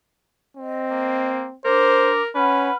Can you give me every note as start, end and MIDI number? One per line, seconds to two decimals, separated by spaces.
0.57 1.56 60
0.57 1.27 75
0.91 1.46 58
1.65 2.19 62
1.65 2.29 70
1.65 2.13 72
1.65 2.19 86
2.35 2.70 61
2.35 2.75 71
2.35 2.73 78
2.35 2.73 83
2.35 2.73 89